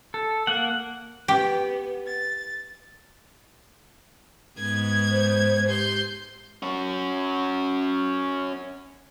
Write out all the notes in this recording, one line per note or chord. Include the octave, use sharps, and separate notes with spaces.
A4
A#3 F#5
B3 G4
A6
G#2 B3 G#6
C5
G4 C6 G6
C#4 F#4